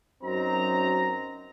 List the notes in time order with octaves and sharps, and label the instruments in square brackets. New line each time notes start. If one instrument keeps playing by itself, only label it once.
[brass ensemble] F#2 C4 D#4 F#4 A#5